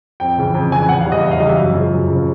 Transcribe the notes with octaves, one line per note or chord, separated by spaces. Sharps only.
F2 G5
C#3 E3
F2
C#3 E3 G#5
E2 F#5
F5
C#3 E3 G3
D#5
E2 E5
F5
C#3 E3 G3 D#5
E5
F#2
C#3 F3 G#3
F#2
C#3 F3 G#3